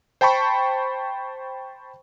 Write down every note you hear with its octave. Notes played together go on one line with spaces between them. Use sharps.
C5 G5 A5 B5 C#6